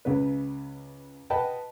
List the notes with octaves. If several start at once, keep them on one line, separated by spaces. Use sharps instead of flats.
C#2 C#3 B4
B4 D#5 F#5 G5 A5 B5